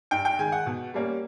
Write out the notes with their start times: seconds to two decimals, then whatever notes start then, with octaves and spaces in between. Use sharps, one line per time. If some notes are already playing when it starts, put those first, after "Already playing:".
0.11 G2 G5
0.25 G5
0.38 D#3 G#3 G#5
0.52 F#5
0.66 B2
0.94 G3 A#3 C#4